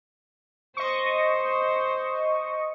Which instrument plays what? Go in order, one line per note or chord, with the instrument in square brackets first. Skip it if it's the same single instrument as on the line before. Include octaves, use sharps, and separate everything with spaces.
[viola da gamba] C5 [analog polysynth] D#5 C#6